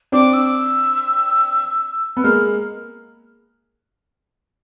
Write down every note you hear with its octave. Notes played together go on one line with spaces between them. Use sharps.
C4 D4 D6
E6
B3
G#3 A#3 F6